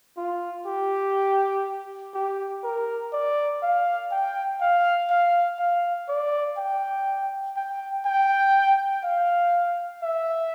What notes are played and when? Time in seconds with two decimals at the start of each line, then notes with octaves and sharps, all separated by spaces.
0.17 F4
0.66 G4
2.14 G4
2.64 A#4
3.13 D5
3.63 F5
4.11 G5
4.61 F5
5.10 F5
5.59 F5
6.08 D5
6.57 G5
7.56 G5
8.06 G5
9.03 F5
10.03 E5